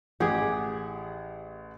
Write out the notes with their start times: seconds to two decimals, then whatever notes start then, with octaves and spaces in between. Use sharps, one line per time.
0.20 A1 G4 G#4 F#5